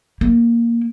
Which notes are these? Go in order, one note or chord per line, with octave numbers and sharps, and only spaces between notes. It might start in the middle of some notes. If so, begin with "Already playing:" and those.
A#3